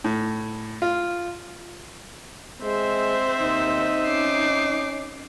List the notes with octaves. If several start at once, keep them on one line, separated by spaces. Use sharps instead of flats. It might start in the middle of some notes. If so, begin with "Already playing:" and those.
A2
F4
G#3 C4 C5 E5
D#2 D#4
C#4 D6 C7